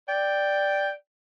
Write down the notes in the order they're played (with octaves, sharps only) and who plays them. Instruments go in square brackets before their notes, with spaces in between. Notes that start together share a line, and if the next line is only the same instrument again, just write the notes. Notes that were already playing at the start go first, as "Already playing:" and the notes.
[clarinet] D5 [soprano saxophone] G5